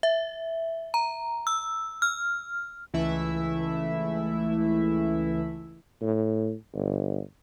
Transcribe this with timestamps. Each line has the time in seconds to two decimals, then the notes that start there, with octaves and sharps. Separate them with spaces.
0.03 E5
0.94 A#5
1.47 E6
2.02 F6
2.93 C#2 E3 A3 E4 E5
6.02 A2
6.75 G1